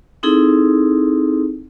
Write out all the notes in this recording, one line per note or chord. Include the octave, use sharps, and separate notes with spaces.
C4 D#4 E4 G#4 A4